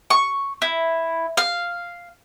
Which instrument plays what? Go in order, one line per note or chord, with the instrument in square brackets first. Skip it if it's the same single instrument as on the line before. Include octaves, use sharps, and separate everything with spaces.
[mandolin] C#6
E4
F5